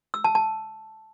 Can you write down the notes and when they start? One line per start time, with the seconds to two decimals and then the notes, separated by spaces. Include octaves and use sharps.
0.14 E6
0.24 A5
0.35 A5